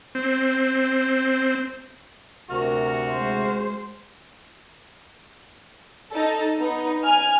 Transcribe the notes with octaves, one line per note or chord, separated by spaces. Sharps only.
C4
D2 C3 F#4 A#4 F6
G#3 C5
D#4 A4
B3 D#4
G#5 F6